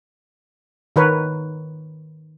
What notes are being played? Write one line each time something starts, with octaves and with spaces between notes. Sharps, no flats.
D#3 A#4 B4 C#5